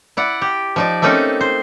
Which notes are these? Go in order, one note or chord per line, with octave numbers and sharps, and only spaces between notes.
E4 D5 F#5
G4
F3 D#4 D5
A3 A#3 C4 C#4 D#4 A4
C5